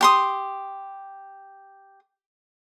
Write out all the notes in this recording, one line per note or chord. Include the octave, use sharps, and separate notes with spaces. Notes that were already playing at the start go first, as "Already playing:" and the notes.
G4 C6 D#6